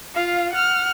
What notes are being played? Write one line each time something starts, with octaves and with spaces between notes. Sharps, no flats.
F4 F5
F#5 F6